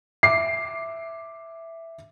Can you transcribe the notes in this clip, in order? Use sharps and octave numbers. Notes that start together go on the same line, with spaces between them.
E5 D6 C7